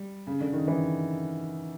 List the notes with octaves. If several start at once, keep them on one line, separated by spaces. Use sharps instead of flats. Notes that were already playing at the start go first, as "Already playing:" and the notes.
Already playing: G3
C#3
D3
D#3
E3